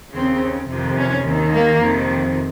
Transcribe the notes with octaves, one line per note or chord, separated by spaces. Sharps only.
D#2 C#3 C4
F2 C3 D#3
C#4
D#2 D#3
A#3
F2 C3 D#3